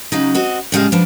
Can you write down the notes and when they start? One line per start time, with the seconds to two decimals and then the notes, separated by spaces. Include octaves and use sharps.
0.12 C#3 F#3 D#4
0.34 C4 F#4 D#5
0.72 A2 C#3 G3 G#3 D#5 F5
0.92 F3 F#3 D4 B4